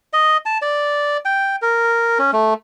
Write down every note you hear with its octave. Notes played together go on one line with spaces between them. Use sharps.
D#5
A5
D5
G5
A#4
C#4
A3